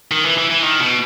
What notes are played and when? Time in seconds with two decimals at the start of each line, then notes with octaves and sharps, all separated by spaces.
0.11 D#3
0.25 E3
0.38 E3
0.50 E3
0.63 D#3
0.80 B2